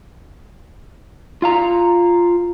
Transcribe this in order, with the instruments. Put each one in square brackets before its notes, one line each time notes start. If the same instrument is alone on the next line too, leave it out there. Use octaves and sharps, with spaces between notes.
[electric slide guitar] F4 F5 A#5